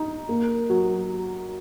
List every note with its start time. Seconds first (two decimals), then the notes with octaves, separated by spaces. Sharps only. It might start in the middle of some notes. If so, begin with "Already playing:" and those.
Already playing: D#4
0.29 A#3
0.70 F#3